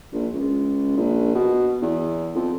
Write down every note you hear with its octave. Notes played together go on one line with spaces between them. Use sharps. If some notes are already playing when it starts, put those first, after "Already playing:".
A#1
C#2
A#1
B2
E2
F2